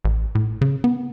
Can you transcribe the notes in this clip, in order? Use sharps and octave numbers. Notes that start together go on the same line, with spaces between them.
A1
A2
C#3
B3